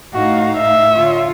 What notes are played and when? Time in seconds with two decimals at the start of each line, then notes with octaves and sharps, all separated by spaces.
0.14 A2 D#4 F#4 F5
0.57 E5
0.92 D3 F4 C#5